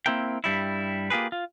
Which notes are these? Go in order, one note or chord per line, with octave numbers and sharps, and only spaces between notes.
A#3 C4 E4 A#4 G5
G2 G3 E4
A#3 F4 G4 G#4 B4
F4